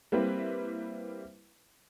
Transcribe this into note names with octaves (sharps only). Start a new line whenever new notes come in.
G3 A#3 C4 E4 B4